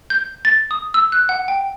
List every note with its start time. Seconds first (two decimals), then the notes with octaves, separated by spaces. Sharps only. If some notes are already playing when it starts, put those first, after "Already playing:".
0.10 G6
0.45 A6
0.71 D#6
0.94 E6
1.12 F#6
1.29 F#5
1.48 G5